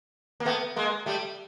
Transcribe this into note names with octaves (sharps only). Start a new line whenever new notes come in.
A#3
A3 B3
G#3 A#3
G3 A3